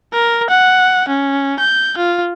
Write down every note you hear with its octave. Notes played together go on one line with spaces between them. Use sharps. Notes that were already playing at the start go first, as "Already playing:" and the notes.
A#4
F#5
C#4
G6
F4